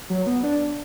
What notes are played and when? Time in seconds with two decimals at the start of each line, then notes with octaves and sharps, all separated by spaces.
0.10 F#3
0.26 B3
0.43 D4